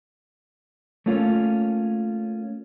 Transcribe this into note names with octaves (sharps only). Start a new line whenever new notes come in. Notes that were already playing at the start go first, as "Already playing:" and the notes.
A3 A#3 C#4 F4